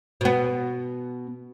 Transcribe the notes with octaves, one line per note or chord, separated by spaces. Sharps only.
B2 B3